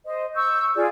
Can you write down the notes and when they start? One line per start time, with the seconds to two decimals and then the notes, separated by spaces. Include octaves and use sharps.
0.06 C5 D#5
0.36 C#6 E6 G6
0.76 F4 G#4 D5